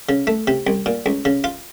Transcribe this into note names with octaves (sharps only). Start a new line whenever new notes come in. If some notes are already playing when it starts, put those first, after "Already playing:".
C#3
A3
C3
C2
A#2
C#2
C#3
F4